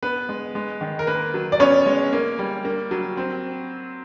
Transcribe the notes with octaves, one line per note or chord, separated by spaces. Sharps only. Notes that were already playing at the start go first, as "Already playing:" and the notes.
B3 B4
G#3
G#3
D#3
A#4
A#3 B4
F#3
D5
B3 C#4 C#5
G#3
A#3
G3
A#3
F#3
C4